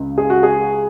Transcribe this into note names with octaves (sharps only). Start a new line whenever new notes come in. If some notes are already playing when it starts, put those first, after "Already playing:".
Already playing: C#2 C#3
G#4
F#4
G#4